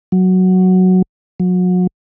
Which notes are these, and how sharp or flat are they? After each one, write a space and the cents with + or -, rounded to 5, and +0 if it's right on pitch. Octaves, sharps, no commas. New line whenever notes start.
F#3 +0
F#3 -35